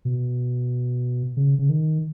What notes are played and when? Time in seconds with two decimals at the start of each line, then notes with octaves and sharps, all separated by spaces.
0.05 B2
1.37 C#3
1.59 C#3
1.69 D#3